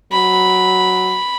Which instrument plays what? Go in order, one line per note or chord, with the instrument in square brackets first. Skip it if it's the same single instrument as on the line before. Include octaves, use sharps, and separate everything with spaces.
[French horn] F#3 [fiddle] B5